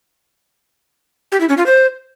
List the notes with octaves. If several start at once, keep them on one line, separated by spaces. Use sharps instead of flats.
G4
E4
C#4
F4
C5